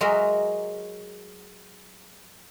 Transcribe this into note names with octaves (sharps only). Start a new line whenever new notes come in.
F#3 G#3 F#4 A#4 D#5 E5